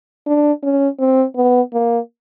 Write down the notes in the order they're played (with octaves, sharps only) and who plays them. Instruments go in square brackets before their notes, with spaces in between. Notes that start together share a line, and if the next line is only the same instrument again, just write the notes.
[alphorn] D4
C#4
C4
B3
A#3